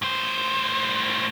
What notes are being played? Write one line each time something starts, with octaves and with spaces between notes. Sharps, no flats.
A2 C5